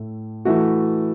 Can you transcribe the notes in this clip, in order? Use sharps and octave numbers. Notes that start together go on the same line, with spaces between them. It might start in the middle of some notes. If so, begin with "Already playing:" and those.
Already playing: A2 A3
E3 A3 F#4